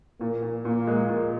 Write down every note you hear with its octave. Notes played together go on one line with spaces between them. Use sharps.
A#2 A#3
A#2
A#2 A#3
G#3
A#2